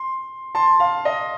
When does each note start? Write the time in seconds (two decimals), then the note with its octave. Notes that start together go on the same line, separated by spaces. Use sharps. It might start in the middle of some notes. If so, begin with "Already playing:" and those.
Already playing: C6
0.55 A5 C6
0.80 F5
1.05 D#5